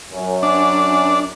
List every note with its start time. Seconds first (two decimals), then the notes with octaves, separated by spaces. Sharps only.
0.12 F#2
0.43 D4